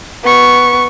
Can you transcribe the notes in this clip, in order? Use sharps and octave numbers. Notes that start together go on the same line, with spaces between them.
B3 C#6